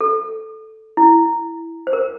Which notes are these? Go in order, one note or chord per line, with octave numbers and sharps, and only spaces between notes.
A4
E4
C5
A#4